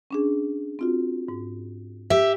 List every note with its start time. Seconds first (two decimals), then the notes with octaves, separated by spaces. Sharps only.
0.11 C#4 D4 G#4
0.79 C4 F4 F#4
1.29 G#2
2.10 G4 E5